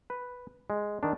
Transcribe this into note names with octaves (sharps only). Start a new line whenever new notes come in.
B4
G#3
D#3 D4